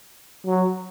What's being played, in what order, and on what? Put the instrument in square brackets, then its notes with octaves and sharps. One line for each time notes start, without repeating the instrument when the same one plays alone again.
[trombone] F#3